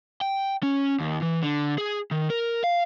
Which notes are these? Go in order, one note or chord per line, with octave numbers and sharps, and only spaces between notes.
G5
C#4
D#2
E3
D3
G#4
D#3
A#4
F5